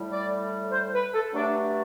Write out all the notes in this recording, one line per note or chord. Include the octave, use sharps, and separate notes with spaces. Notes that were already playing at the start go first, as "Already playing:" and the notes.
Already playing: A2 G3
D5
C5
B4
A4
G2 F#3 A3 D4